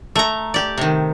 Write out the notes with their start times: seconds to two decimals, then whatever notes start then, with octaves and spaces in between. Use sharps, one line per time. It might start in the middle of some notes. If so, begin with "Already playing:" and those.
0.15 A3 A#5
0.54 G4 D5
0.78 C3 D#3